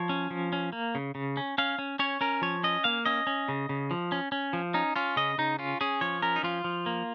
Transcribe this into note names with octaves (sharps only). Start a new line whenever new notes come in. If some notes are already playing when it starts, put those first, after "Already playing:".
Already playing: F3 C#5
C#4
F3
C#4
A#3
C#3
C#3
C#4
C#4 F5
C#4
C#4 C#5
C#4 A#4
F3 C#5
C#4 D#5
A#3 F5
C#4 D#5
C#4
C#3
C#3
F3
C#4
C#4
F3
C#4 D#4
C#4 F4
C#3 D#5
C#3 D#4
C#4 F4
C#4 G#4
F3 C#5
C#4 A#4
D#4
F3 F4
F3
A#3